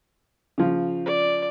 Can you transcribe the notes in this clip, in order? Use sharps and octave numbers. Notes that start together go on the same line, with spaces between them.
C#3 F3
D5